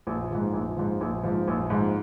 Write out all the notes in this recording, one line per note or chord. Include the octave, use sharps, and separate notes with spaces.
A#1
G#2 F3
A#1
G#2 F3
A#1
G#2 F3
A#1
G#2 F3